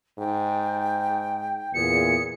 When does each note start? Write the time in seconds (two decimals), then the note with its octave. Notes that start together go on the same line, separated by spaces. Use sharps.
0.19 G#2 G5
1.74 E2 A#2 G#4 C#7